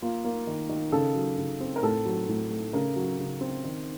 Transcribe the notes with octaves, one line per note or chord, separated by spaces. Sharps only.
A#3 F4
A#3
D#3
D#3
C#3 A4
F#3
C#3
C4
A#4
A2 A4
F#3
A2
A3
C#3 A#4
F#3
C#3
C4
D#3